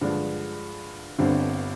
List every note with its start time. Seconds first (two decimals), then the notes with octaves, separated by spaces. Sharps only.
0.01 G2 D3 F3 G#3 D4
1.18 G1 G2 D3 G3 C4